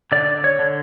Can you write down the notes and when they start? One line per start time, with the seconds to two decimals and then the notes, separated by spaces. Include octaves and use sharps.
0.12 D3 D5
0.44 C#5
0.59 D3